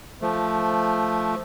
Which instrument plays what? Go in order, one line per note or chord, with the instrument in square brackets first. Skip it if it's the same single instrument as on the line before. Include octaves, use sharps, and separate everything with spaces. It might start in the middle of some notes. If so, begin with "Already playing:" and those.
[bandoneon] F3 A3